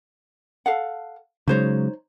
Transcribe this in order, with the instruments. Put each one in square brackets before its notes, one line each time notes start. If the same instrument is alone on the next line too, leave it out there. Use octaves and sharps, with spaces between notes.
[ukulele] A4 F5 F#5
[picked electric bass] C#3 F#3 G#3 [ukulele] D#4 C5 C#5